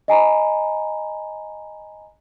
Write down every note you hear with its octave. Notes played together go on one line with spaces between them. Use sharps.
D#5 G#5 A#5 B5